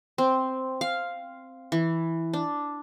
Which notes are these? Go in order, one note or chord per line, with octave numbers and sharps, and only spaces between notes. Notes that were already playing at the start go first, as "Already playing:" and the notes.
C4
F5
E3
D4